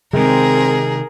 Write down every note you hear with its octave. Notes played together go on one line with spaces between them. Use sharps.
C3 D#3 G#3 C4 G#4 A#4